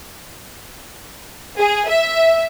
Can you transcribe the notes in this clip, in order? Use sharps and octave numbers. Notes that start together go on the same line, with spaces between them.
G#4
E5